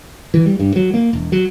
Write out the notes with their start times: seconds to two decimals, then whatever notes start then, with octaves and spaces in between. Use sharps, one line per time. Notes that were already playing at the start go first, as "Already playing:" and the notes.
0.34 E3
0.46 G3
0.59 G2
0.76 F#3
0.94 A#3
1.13 E1
1.32 F#3